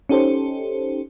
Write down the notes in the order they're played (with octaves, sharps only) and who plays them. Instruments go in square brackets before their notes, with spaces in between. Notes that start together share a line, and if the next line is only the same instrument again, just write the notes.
[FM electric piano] C#4 D#4 G4 A4 C5